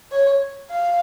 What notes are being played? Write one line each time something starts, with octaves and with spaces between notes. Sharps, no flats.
C#5
F5